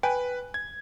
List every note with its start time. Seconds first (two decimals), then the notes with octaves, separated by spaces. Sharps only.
0.03 B4 G5 G#5
0.54 G#6